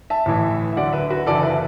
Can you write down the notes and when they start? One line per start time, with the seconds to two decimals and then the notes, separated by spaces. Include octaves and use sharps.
0.10 E5 A5
0.26 A1 A2 E3
0.73 E5
0.76 D2 D3 F#3 D5 F#5
0.93 B4 E5
1.10 F#4 B4
1.26 F#1 F#2 E3 A4 D5
1.43 B4 E5